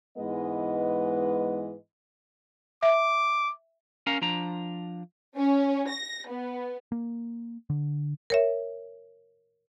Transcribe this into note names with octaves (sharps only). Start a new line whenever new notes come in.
G#2 E3 G#3 B3 B4 D#5
E5 D6
C#4 A#4 F5 A#5
F3 D4 A#5
C#4
A#6
B3
A#3
D3
A#4 C#5 E5